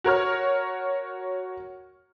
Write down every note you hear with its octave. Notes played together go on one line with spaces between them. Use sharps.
F#4 A#4 C#5 F6